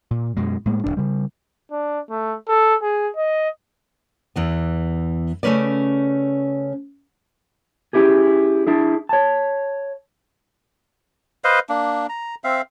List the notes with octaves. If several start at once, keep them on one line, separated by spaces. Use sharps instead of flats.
A#2
F#2 B2 G#3
A2 G#3 A#3
D1 G#2 D4
C#3 G3
D4
A3
A4
G#4
D#5
E2 E3 B3
C#3 A3 A#3 C#4 B4 D5
C#4 E4 G4 G#4
D4 E4 G#4
C#5 A5
B4 C5 D#5 F5
A#3 D4
A#5
C4 E5 F5